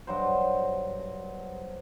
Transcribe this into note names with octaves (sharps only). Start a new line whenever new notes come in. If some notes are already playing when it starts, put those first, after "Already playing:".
G2 F#3 C5